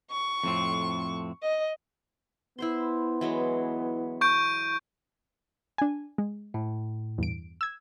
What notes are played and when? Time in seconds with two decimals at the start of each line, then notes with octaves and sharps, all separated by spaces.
0.11 C#6
0.44 F2 A2 C4
1.43 D#5
2.58 B3 E4 C5 C6
3.21 E3 F#3 G#3
4.21 C#6 G6 D7
5.78 D4 G#5
6.18 G#3
6.54 A2
7.18 E2 G2 D7
7.61 E6 G#6